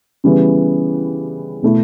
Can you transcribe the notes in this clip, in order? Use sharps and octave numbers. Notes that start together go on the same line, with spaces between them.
C#3 E3 G3 B3
B2 A3 E4